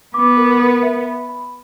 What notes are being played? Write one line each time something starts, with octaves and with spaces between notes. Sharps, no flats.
B3 D6
A#4
A#4
E5
B5
B5